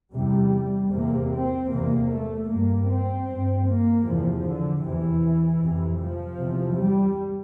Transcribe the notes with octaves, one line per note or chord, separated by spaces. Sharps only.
E2 C3 G3
E2 C3 A#3
C4
E2 C3 A#3
A3
G2 A#3
C4
G2
A#3
E2 C3 F3
D3
E2 C3 E3
F2 C3
F3
E2 C3
G3